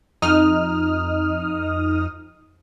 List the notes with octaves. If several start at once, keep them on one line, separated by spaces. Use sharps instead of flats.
F2 D#4 D#6 F6